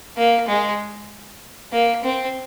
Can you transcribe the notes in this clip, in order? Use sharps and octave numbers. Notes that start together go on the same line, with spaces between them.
A#3
G#3
A#3
C4